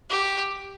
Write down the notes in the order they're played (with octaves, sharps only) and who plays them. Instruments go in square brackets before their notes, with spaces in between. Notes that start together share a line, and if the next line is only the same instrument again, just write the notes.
[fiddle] G4